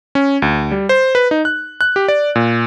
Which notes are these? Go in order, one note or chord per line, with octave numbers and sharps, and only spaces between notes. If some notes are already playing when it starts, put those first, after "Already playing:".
C#4
D2
G3
C5
B4
D#4
F#6
F#6
G4
D5
A#2